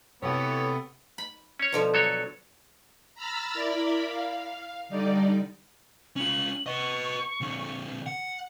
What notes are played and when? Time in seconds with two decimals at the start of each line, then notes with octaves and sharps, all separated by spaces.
0.22 C3 E3 A3 B3 F#4 A4 C#5 F#5
1.18 B5
1.59 C#4 C#5
1.72 B2 D3 F3
1.94 F#3 A4 C#5
3.14 A#5 B5 E6 F6 A6
3.53 E4 A#4 D5 B5
4.06 F5
4.89 D3 G3 D#4 D5
6.16 C#4 F4 F#7
6.66 B4 D#5 C#6
7.41 A#2 D3
8.06 F#5